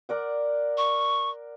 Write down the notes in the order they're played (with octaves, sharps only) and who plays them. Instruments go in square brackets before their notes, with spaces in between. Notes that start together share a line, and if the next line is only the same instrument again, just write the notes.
[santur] A#4 D5 F#5
[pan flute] C#6